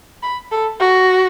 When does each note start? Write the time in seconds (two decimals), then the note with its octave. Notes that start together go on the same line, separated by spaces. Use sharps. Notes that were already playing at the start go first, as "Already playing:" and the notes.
0.23 B5
0.52 A4
0.80 F#4